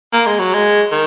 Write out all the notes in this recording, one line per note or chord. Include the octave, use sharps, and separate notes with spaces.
A#3
G#3
F#3
G#3
D#3